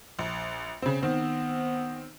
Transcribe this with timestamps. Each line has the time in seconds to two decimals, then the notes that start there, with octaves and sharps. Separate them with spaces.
0.19 A#1
0.82 C#3 C4
1.03 D#3 B3 C4